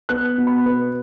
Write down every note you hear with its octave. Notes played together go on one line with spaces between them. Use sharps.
B3 F#6
B2
B5
B3